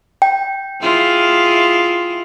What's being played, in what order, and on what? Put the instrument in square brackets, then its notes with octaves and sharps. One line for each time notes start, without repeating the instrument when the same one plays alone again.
[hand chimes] G5
[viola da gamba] E4 F4 G#4